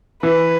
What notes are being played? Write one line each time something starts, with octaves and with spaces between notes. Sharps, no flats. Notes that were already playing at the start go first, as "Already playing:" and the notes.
E3 B4